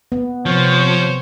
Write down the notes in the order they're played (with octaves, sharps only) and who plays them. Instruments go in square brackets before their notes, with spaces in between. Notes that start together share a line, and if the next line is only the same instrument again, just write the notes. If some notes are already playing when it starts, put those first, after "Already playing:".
[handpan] B3
[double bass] C3 [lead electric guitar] F3 [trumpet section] C5 C#5